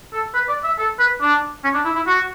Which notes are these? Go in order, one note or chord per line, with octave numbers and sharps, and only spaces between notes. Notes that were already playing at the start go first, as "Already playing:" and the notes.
A4
B4
D5
E5
A4
B4
D4
C#4
D4
E4
E4
F#4